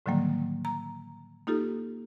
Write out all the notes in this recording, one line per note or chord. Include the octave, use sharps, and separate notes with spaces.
A2 D3 D#3 F#3 G3 A#3
A#5
A#3 D#4 F4 G4 A4